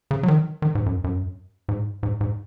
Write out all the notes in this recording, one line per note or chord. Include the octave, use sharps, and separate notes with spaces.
C#3
F#3
D#3
D#3
G#2
F#2
F#2
G#2
G#2
G#2